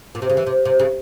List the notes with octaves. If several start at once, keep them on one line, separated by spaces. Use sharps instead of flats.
A#2
C3
C#3
E3
C3
C3
C#3